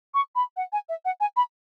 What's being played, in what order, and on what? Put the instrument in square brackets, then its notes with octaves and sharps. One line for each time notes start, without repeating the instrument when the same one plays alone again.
[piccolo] C#6
B5
F#5
G#5
E5
F#5
G#5
B5